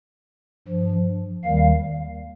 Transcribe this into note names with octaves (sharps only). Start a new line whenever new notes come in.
G2 F3
D#2 D#3 G3 F5